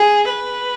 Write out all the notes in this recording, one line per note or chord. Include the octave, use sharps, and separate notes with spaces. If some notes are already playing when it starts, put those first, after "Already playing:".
Already playing: G#4
B4